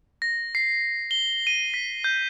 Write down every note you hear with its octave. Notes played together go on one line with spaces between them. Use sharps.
A#6
C7
G7
D#7
B6
G6